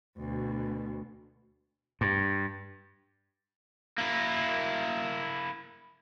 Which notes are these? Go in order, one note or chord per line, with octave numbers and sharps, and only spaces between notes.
D2 B2
G2
A#3 E4